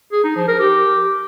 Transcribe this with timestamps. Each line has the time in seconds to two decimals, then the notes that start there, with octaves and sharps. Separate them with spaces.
0.12 G#4
0.24 D#4
0.36 F3
0.47 A#4
0.59 G4